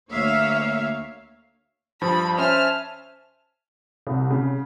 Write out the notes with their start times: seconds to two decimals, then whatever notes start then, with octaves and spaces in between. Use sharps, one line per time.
0.11 D2 A#3 C#5 E5 F5
2.01 G2 F3 B5
2.38 C#4 C5 E5 G#5 A5 F6
4.07 C2 C3
4.30 C#3